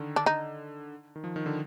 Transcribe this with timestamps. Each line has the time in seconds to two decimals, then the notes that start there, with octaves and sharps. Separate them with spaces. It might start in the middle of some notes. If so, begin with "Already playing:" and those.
Already playing: D3 D#3
0.16 D4
0.26 D#4
1.16 D#3
1.24 F3
1.36 D#3
1.46 D3